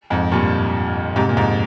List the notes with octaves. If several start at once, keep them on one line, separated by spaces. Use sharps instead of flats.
F2 G#2
G2 A#2
G#2 C3
A#2
F2 G#2